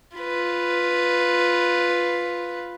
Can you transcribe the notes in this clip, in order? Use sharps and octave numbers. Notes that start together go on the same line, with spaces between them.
F4 B4